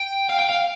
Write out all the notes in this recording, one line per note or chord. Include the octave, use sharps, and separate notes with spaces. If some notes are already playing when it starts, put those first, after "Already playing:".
Already playing: G5
F5
G5
F5